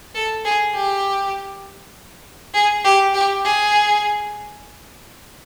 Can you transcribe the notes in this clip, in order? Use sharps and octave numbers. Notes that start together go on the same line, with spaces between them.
A4
G#4
G4
G#4
G4
G4
G#4